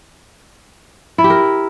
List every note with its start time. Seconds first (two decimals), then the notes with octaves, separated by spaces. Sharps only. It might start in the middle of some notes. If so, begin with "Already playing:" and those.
1.18 E4
1.24 G4
1.30 A#4